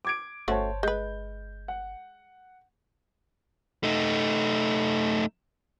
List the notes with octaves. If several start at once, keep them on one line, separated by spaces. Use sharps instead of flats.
D6 G#6 D7
G1 A3 C#4 F#4 C5 C#5 A5
G#3 B4 G6
F#5
A3 D#4